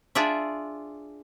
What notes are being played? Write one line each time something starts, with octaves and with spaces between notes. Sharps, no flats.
D4 F4 G#4 D5 E5